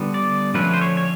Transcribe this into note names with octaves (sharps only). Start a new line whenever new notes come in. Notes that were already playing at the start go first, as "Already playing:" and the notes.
Already playing: D3 G3 B3
D5
D3 F3 A3 C#4 B4
C5
C#5
C#5